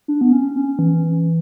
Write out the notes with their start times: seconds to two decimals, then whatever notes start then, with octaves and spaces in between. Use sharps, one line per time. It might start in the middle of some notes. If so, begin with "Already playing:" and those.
0.08 D4
0.21 B3
0.33 C#4
0.56 C#4
0.79 E3